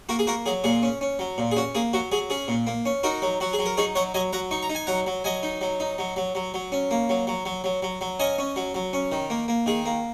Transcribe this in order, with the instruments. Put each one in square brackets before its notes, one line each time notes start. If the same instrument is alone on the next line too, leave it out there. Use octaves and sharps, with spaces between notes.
[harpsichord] A#3 F#4 A#4
G#4
A#3 F#4 A#4
F#3 G#4
A#2 G#4
C#4
C#4
F#3
A#2
G#4
C#4 F#4
A#3 G#4
F#3 F#4
F#3 G#4
C#4 G#4
A#2
A#3
C#4
D#4 F#4 A#4
F#3
F#3 F#4
G#4
F#3
A#4
D#4 G#4 C#5
F#3 C#5 F#5
F#3 D#5 G#5
F#3 F#5 A#5
D#4 C#6
A#5
D#4
G#5
F#3 F#5 A#5
F#3
F#3 D#5 G#5
D#4
F#3
D#4
F#3
F#3
F#3
F#3
C#4
A#3
F#3
F#3
F#3
F#3
F#3
F#3
C#4 D#5 G#5
C#4
F#3
F#3
C#4
D#3
A#3
A#3
D#3 G#4
A#3